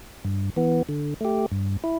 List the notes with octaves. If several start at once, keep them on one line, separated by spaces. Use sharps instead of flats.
G2
E3 B3
D3
A3 G4
G2
E4